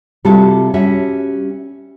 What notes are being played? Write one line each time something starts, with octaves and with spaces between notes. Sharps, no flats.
C3 G3 F4 F#4 A4
G3 C#4 F#4 E5